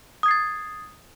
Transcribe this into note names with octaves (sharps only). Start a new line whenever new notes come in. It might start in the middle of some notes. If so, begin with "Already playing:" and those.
D#6 G#6 A6 C7